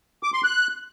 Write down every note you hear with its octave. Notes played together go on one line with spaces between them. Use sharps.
D6
C6
F#6